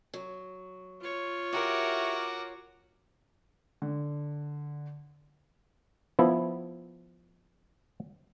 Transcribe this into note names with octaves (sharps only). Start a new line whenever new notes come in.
F#3
F4 C#5
E4 F#4 G4 A#4 D6
D3
F3 B3 E4